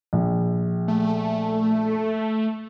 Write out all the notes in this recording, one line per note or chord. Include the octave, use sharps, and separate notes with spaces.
A#1
A3